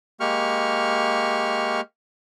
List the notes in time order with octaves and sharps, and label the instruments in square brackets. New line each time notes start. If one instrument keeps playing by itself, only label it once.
[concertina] G#3 A#3 G4 C#6 F6